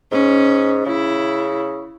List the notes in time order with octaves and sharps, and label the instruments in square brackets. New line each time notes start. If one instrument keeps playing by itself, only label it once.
[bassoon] G#2 [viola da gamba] C#4
[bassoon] C#3 [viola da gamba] E4